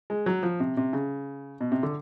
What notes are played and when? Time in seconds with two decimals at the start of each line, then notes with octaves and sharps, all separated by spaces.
0.10 G#3
0.26 F#3
0.43 F3
0.60 C3
0.77 C3
0.93 C#3
1.61 B2
1.72 C3
1.83 D3